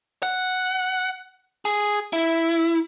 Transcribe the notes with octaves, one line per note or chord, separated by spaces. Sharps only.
F#5
G#4
E4